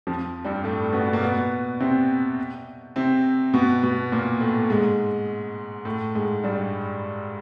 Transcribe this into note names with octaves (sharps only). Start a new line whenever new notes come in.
F2 F3
G2 G3
A2 A3
B2 B3
A#3
B2 B3
C3 C4
C3 C4
B2 B3
B2 B3
A#2 A#3
A2 A3
G#2 G#3
A2 A3
G#2 G#3
G2 G3